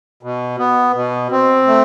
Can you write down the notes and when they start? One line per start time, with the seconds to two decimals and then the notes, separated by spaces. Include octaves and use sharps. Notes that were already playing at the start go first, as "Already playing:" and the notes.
0.23 B2
0.59 B3
0.94 B2
1.32 C4
1.67 A3